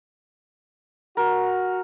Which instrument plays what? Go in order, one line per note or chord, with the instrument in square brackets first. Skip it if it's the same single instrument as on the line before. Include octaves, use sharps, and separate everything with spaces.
[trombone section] F#4 [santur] A#4